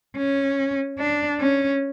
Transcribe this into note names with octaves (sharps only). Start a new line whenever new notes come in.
C#4
D4
C#4